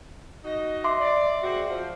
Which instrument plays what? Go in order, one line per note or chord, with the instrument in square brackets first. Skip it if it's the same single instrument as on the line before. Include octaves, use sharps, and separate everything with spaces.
[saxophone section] D#4 F#4 D#5
[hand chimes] E5 C6 D6
[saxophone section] D5
G#3 C4 F#4
F3